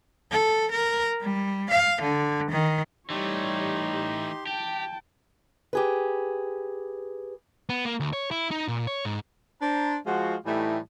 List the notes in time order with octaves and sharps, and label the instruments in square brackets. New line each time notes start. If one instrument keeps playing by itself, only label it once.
[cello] A4
A#4
G3
F5
D3
D#3
[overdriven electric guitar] E3 A3 [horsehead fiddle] G3 C#5 [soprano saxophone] D#4 [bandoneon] G4 C6
[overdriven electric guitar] G4 [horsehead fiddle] G5 A5
[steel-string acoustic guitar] G4 G#4 B4
[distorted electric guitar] B3
A#3
D2
C#5
E4
D#4
A#2
C#5
G#2
[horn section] D4 C5 A#5
F3 G#3 F4 F#4
A2 E3 G3 A3 D#4 G4